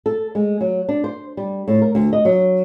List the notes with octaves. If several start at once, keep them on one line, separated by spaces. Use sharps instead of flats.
A4
G#3
F#3
D4
C5
G3
A2
A#4
D2
D#5
F#3